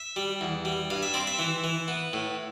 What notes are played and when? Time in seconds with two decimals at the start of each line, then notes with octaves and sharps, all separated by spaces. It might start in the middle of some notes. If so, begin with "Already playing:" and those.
Already playing: E5
0.16 G3
0.41 E2
0.65 G3
0.90 G2 F5
1.03 E5
1.14 C4 D5
1.27 E5
1.39 E3
1.64 E3
1.88 B3
2.13 A2